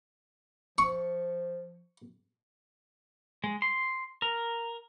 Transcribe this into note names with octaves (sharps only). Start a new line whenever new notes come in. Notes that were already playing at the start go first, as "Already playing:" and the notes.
F3 C#6
G#3
C6
A#4